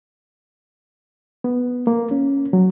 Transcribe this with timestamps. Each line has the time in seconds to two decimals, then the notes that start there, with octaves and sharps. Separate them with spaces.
1.44 B3
1.87 A#3
2.11 C#4
2.53 F#3